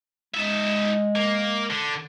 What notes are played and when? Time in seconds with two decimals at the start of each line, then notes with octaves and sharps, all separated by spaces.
0.35 G#3 D#4 E5
1.15 A#3
1.70 D3